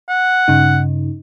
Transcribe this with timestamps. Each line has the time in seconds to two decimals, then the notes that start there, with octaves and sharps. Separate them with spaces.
0.09 F#5
0.48 G2 C#3 D#4